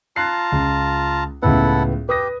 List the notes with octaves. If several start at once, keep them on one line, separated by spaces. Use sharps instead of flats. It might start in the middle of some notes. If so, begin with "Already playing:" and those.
F4 A5 A#5 F#6 C7
C#2
C#2 A2 B3 E4 A4 F#5
G4 B4 D#6 A#6